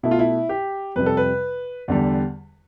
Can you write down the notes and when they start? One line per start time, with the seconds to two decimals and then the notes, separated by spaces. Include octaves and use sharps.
0.03 B2 A3 E4
0.11 F4
0.19 E4
0.49 G4
0.96 F2 C3 G3 B4
1.06 A4
1.17 B4
1.88 E2 D3 G3